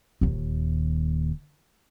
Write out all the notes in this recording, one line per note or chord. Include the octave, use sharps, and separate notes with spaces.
D#1 D#2